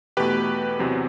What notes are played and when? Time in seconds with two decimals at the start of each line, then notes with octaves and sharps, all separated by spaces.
0.17 E2 B2 A3 G4 B4
0.79 E2 C3 F#3 C4